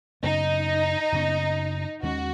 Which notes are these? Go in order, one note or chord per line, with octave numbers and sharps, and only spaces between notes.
F#2 C#3 B3 D#4
F#2 C#3 B3
D#2 D#3 G#3 C#4 F#4